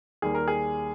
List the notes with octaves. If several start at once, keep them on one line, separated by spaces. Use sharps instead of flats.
D#2 D#3 G3 A#3 G#4
A#4
G#4